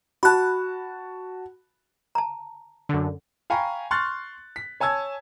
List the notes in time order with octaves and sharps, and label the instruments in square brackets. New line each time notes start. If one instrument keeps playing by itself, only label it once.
[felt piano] F#4 A5 [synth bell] B5 F#6
[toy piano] A5 A#5
[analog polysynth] F#2 D3
[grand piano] F5 G5 G#5 A#5 B5 C#6
C6 C#6 F6 F#6 A6
B6
C#5 G#5 A5 E6 G#6